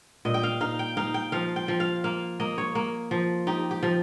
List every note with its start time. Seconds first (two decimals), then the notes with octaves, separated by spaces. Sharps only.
0.25 A#2 D#5
0.34 G5
0.43 F5
0.61 D#4 F5
0.79 G5
0.97 D#4 F5
1.14 G5
1.32 F3 F5
1.56 G5
1.68 F3
1.80 F5
2.04 A#3 F5
2.40 A#3 D#5
2.58 C#5
2.75 A#3
3.11 F3
3.47 D#4 G4
3.71 G4
3.83 F3